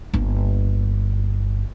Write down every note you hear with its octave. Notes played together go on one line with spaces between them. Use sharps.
G1 A#3